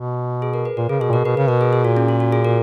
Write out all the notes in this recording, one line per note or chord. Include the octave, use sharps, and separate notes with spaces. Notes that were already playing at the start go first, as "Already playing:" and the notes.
Already playing: B2
G#4
A#4
B4
A#2 A#4
C#3 G#4
B2 G#4
A#2
B2 A#4
B2 B4
C#3 B4
B2 A#4
G#4
G#4
A#2 F#4
C#4
F4
F#4
G#4
A#4